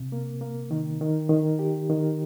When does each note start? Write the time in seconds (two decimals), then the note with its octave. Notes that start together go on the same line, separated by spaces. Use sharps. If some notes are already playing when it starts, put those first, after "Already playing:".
Already playing: C3
0.12 A#3
0.41 A#3
0.71 D#3
1.01 D#3
1.29 D#3
1.59 G4
1.90 D#3